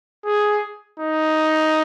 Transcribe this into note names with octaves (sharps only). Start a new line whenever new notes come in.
G#4
D#4